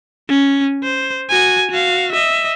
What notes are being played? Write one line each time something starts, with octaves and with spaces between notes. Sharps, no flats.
C#4
C5
F#4 G#5
F#4 F5
D#5 E5